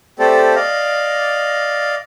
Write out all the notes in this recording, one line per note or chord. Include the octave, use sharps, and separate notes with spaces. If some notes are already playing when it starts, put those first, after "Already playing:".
A3 C4 G4 A4 C5 D5
D5 D#5 F5